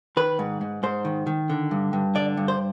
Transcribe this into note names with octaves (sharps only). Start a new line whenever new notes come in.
D#3 B4
G#2
G#2
G#2 C5
D#3
D#3
D3
G2
G2
D3 D5
G2
C5